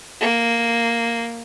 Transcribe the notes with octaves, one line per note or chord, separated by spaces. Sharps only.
A#3